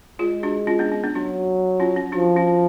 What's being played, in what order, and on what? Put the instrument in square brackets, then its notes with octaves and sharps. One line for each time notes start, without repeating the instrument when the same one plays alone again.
[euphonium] G#3 [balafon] F4 G#4
[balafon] D4 F#4
C#4 F4
B3 D4
C#4
B3 D4
[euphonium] F#3 [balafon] D4 F#4
[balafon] C#4 F4
C#4
[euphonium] F3 [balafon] D4 F#4
[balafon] C#4 F4